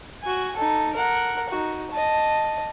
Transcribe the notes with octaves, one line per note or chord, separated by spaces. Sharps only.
F#4 G#5
D#4 A4
A#4 F#5
D#4 F#4
D#5 A5